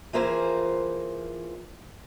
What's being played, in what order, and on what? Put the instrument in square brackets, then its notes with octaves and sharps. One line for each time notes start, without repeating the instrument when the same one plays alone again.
[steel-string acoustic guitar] E3 F3 A#3 F4 G#4 C5